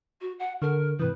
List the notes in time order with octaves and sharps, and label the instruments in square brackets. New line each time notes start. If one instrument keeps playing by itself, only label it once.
[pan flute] F#4
F#5
[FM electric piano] D3 A4 [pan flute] A#4
[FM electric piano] G#2 C3 E3 [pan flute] B4